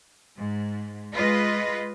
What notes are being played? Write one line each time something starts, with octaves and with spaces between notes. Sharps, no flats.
G#2
G#3 F4 B4 D#5